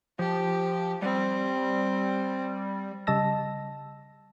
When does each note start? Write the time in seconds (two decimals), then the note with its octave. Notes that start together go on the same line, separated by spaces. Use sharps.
0.19 F3 G4
1.02 G3 C4
3.07 C#3 G3 D#5 A5 E6 A#6